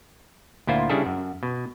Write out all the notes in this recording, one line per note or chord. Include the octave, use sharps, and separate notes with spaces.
D2 A#2 E4 F4 C5
C#3 G3 D4 E4 G#4 A4
F#2
B2